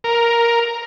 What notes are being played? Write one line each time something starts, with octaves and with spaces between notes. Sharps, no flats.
A#4